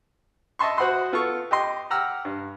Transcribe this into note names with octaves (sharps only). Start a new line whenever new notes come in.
D#5 E5 A5 C6 C#6
F#4 C5 F#5 B5 C6 D#6
B3 F4 A4 C#6
G4 D#5 C6
G4 F#5 A#5 E6 F6
G2